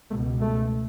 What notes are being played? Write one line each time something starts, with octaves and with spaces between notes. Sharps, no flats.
C#2 B2 A3
A3